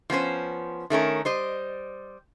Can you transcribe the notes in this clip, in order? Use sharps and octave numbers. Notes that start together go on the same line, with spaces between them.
F3 B3 C#4 C5
D#3 A3 C#4 A#4
G3 C5 D#5